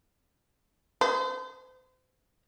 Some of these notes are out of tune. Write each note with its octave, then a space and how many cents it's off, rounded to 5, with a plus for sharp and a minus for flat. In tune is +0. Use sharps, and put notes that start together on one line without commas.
C5 -35